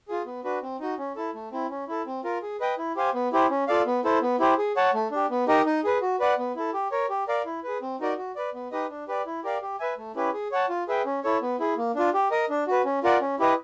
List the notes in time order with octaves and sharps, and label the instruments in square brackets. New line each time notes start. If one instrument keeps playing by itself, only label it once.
[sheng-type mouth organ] F4 G#4
B3
D4 F#4 B4
C4
D#4 F#4
C#4
E4 A4
A3
C4 E4
C#4
E4 A4
C4
F4 A#4
G#4
B4 D#5 G5
E4
G4 C5 F5 G#5
B3
E4 G4 C5
C#4
F4 A4 D5 F5
B3
E4 A4 C5
B3
E4 G4 C5
G#4
C#5 F#5 A5
A3
D4 G4
B3
D#4 G4 A#4 D#5
D#4
G#4 B4
F#4
B4 D5 F#5
B3
E4 A4
G4
A#4 C#5
G4
A#4 D5 F5
E4
G#4 B4
C4
D#4 F#4 A#4 D5
F#4
B4 D5
B3
D#4 G4 B4 D#5
D4
G4 B4 D5
E4
G4 A#4 D5 F5
G4
B4 E5 G#5
A3
C#4 E4 G4 B4
G#4
C#5 F#5 A5
F4
G#4 B4 E5 G5
C#4
E4 A4 C#5
B3
E4 G#4
A#3
D4 F4
G4
A#4 D#5
D4
F#4 B4
C#4
F4 A#4 D5 F#5
C#4
E4 G4 B4 D#5